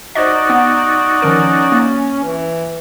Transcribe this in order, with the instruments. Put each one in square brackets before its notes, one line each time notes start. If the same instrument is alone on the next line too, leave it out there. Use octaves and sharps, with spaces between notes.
[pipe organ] D#4 F#4 D5 [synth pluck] C5 D#5
[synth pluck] B3
[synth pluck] D#3 F3 A#4 [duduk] C#4
[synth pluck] A#3
[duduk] E3